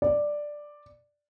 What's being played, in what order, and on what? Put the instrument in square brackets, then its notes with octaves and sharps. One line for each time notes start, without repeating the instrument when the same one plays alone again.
[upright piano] D5